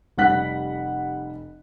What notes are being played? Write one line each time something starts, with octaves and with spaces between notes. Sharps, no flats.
F1 G3 F#5 F#6 B6